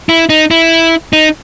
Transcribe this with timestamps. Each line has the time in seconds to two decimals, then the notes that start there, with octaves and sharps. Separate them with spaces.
0.09 E4
0.29 D#4
0.51 E4
1.13 D#4